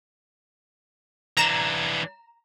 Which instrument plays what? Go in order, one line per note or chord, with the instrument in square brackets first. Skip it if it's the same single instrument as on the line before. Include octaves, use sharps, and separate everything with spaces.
[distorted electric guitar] E3 D4 [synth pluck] A#5 E7